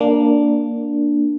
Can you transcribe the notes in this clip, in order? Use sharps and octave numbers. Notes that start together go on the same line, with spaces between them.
A#3 D4